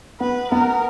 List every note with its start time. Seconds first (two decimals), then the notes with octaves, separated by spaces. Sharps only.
0.20 B3 B4
0.51 B3 A#4